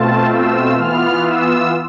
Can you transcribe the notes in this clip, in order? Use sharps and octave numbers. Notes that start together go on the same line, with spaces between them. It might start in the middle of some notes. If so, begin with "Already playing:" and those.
Already playing: B2 A3 C4 F4 A5
E6
E3 B3 F4 F6
E6